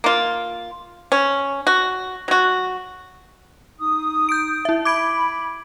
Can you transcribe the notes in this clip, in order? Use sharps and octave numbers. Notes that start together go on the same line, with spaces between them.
A#3 F4
C#4
F#4
F#3 F#4
D#4 D#6
G6 D7
E4 E5
B5 D6 G#6 D7